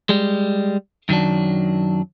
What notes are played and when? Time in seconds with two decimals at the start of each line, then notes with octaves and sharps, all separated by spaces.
0.09 G3 G#3
1.09 F#2 D#3 F#3 D4